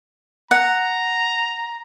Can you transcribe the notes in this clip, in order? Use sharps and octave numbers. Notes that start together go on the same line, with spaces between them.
F#5 A#5